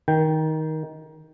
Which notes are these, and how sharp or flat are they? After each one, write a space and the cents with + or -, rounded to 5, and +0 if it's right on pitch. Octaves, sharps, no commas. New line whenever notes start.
D#3 +15 G5 +0